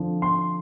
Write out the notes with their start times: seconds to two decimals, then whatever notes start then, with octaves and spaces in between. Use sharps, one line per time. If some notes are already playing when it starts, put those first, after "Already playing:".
Already playing: F2 D3 F3
0.22 C6